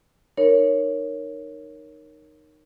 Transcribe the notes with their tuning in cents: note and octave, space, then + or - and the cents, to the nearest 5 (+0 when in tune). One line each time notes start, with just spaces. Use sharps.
D#4 -15 A#4 +0 C#5 +0